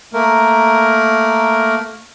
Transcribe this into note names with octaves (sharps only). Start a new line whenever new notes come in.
A3 A#3 A#4